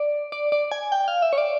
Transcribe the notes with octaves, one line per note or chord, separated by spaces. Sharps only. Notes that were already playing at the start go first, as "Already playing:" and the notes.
Already playing: D5
D5
D5
G#5
G5
F5
E5
C#5
D5